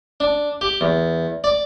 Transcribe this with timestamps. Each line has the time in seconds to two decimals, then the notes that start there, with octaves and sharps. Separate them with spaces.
0.20 D4
0.61 G4
0.81 E2
1.44 D5